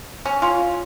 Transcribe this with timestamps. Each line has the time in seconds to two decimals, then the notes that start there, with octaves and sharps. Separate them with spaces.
0.25 C#4
0.42 C#4 F4